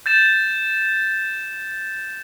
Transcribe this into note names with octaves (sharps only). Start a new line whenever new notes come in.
G6 A6 E7